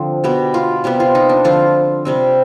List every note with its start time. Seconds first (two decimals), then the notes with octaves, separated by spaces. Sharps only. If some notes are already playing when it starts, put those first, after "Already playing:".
Already playing: D3 F3 C4
0.24 B2 B3 G4
0.54 F4
0.84 C3 G3 B3 G4
1.00 F4
1.15 D#4
1.29 D4
1.44 D3 F3 C4 F4
2.05 C3 G3 C4